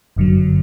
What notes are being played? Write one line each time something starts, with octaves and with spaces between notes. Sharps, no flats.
G1 F#2 D3 F#3